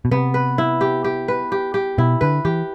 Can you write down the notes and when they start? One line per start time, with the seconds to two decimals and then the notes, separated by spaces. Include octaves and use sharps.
0.05 B2
0.11 C3 B3
0.34 B4
0.58 E4
0.81 G4
1.04 G4
1.28 B4
1.52 G4
1.74 G4
1.98 B2 E4
2.21 D3 B4
2.45 E3 G4